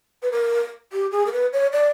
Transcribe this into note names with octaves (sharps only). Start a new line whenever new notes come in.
B4
A#4
G4
G#4
A#4
B4
C#5
D5